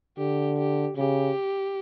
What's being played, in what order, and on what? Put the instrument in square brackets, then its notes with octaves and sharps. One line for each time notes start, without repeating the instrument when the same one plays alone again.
[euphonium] D3 [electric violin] G4
[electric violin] G4
[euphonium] C#3 [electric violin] G4